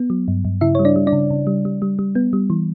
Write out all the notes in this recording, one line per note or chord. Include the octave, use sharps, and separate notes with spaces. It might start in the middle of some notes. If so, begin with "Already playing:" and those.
Already playing: B3
F#3
G2
G2
C#3 E4 E5
C#5
G3
D4 D5
G3
D4 D5
C#3
C#3
G3
G3
G3
G3
B3
G3
E3